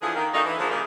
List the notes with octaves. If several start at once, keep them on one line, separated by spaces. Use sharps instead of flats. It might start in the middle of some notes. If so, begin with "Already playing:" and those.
D3 E3 F3 G#4
D#3 A#3
F#2 A3 A#3 D4 D#4
E3
D3 F3 G#3 A#3
A#2 D#3 F3 G3 G#3 A#3